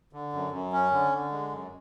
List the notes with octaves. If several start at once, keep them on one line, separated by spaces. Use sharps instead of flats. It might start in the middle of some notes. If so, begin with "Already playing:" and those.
D3
F#2
F#2
C#4
D3
D3
G#3
F#2